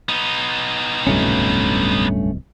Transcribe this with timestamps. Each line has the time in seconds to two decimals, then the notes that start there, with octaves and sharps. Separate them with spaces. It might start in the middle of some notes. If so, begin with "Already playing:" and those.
0.09 B3 D#4
1.07 D1 C2 G2 B2 A3 C#4